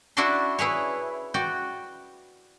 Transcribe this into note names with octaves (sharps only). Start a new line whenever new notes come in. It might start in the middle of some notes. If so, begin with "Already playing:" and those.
D4 E4 F#4 D5 A5 C6
E4 G#4 B4 C#5
F#4 D5 G5